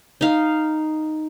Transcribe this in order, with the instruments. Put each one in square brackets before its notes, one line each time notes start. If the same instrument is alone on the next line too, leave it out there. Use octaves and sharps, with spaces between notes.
[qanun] D#4 F5